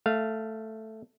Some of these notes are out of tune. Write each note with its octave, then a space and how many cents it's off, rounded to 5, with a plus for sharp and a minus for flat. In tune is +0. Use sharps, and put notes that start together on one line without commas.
A3 +0 F5 -10